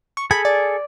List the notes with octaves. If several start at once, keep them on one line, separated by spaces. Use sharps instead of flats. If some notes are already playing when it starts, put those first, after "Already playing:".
C#6
G#4 A4 G#5 B5
D5